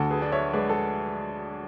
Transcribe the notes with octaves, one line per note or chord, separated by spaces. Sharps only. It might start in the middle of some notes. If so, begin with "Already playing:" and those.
Already playing: D2 A4
G#4 B4
D4
C#5 E5
G#3 B4 D5
A4